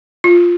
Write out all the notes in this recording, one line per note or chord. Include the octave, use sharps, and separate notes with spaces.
F4